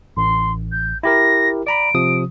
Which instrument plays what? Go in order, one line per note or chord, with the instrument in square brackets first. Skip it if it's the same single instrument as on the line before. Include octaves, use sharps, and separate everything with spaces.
[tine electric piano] A1 [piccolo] C6
[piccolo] G6
[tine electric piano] E4 G4 A#4 [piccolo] A#6
[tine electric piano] D5 A#5 B5 [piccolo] D7
[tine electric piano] C3 F3 D#6